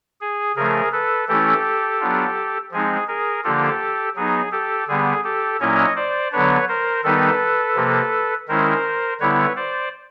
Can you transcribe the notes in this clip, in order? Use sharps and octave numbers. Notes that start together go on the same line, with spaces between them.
G#4
C#3 F3 A3 G#4 A#4
A4 B4
E3 A3 C#4 E4 G4 A4
F#3 B3 D4 F4
F3 G#3 C4 D#4 G#4
G#4 A#4
D3 F3 A#3 D4 F4 G4 A4
F#3 B3 D#4 G#4
G4 A4
D3 G3 B3 G#4
G4 A4
A#2 F#3 A#3 C#4 E4 C#5 D#5
C5 D5
D3 F#3 B3 D4 B4 C#5
A#4 C5
D#3 G3 B3 D#4 A4 B4
C3 F3 A#3
D#3 G#3 C#4 E4 A#4 C5
D3 G3 B3 E4 B4 C#5
C5 D5